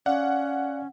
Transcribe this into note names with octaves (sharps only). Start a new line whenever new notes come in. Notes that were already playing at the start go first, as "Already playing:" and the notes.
C#4 D5 F5 F#5